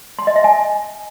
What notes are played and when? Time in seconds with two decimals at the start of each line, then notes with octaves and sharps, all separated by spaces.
0.19 C6
0.27 D#5
0.36 E5
0.44 G#5